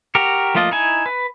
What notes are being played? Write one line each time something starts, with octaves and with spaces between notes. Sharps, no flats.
F#4 G4 A#4
F3 A3 A#3 F4 D#5
D#4 E4 G#5
B4